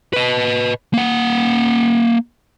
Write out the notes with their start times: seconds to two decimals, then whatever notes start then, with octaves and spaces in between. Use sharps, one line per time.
0.13 B4 D#5
0.94 A#3 F#5